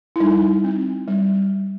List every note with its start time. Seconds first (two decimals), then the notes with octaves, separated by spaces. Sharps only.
0.16 E4
0.20 G3 D#4
0.64 C4
1.08 G3